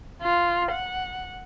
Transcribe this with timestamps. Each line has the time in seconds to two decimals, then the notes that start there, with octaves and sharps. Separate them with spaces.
0.22 F4
0.71 F#5